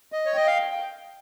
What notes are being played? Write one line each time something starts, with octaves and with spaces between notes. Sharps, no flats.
D#5
C#5
D#5 G5
F5